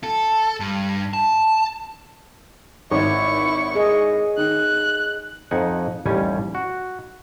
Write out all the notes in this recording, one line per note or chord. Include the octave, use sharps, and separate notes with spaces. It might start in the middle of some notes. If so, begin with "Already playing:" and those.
A4
G2
A5
G#1 E4 C#5 C#6
G#4 D#5
D#3 F#6
F2 D#4 F#5 G#5
A1 D#2 G3 C#4 G#5
F#4